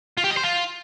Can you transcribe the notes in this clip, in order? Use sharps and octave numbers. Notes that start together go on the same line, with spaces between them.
F4
G4
D#5
C5
F4